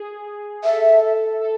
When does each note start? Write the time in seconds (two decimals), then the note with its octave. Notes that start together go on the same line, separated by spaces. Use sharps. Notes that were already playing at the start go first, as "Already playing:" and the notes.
Already playing: G#4
0.64 A4 E5
1.41 A4